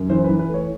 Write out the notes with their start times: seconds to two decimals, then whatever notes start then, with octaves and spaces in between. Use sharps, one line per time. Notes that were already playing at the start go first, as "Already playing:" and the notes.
Already playing: F#2
0.09 E3 C5
0.24 E3 B4
0.39 B4
0.49 A3
0.54 C#5